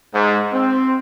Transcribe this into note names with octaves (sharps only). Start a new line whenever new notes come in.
G#2
C4